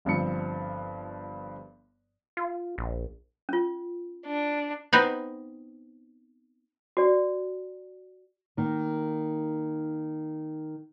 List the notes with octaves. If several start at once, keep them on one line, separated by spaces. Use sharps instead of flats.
G1 G2 F3 C4 C#7
F4
A#1
C#4 F4
D4
B3 C4 D#4 B4
F#4 D5
D#3 A#3